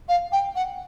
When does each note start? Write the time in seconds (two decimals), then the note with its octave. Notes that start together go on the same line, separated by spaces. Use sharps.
0.08 F5
0.32 G5
0.56 F#5